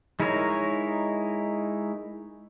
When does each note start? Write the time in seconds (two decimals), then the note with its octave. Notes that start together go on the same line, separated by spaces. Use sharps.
0.20 G#3 D#4 E4 A#4 C#5